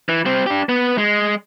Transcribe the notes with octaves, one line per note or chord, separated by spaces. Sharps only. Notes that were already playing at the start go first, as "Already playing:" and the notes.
E3
G3 C4
D4 G4
B3
G#3